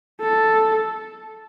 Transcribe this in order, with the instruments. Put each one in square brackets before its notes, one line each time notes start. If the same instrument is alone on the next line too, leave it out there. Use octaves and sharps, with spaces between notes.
[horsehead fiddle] A4